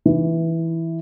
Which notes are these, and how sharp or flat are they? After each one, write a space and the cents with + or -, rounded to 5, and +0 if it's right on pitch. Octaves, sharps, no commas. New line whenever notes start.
E3 -5